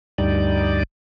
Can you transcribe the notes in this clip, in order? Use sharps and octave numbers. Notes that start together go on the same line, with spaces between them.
D2 G2 G3 D#4 D5